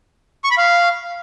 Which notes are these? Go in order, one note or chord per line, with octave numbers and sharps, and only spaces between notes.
C#6
B5
F5